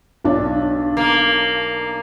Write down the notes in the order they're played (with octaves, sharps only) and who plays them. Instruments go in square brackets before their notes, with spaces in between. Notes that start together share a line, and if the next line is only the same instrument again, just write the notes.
[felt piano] B1 D4 C#5
[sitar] A#3